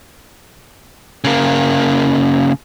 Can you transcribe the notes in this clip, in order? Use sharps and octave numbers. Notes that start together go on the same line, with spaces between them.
C#3 A#3